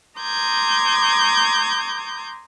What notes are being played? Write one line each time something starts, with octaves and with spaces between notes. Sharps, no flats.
A#5 C6 D6 D#6 G6 G#6